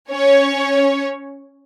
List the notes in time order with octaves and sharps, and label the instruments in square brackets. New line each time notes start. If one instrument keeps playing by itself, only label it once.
[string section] C#4 C#5